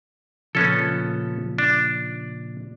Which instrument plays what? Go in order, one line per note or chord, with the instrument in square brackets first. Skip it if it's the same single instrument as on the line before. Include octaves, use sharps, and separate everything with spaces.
[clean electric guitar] A#2 C#3 F3 [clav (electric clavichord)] B3 C#4 A4
[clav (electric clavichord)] D4